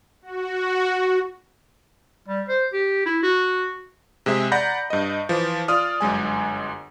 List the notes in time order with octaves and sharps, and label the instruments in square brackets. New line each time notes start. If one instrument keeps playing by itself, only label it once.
[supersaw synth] F#4
[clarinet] G3
C5
G4
E4
F#4
[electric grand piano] C3 G#3 G#4 E5
D5 F#5 A#5 B5 G6 A#6
G2 D#5
E3 F3
F4 D5 D#6 F6
G1 F#2 G#3 G#5